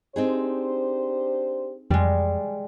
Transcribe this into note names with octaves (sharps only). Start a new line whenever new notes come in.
C4 D4 D#4 G4 G#4 C5
F2 G3 G#3